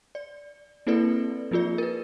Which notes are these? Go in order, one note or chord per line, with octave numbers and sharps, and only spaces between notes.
D5
A#3 C4 E4 A4 B4 D5
F3 A#3 F4 G#4 D5
A#4 B4